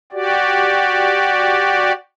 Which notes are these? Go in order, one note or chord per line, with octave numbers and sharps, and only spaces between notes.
F#4 G4 D5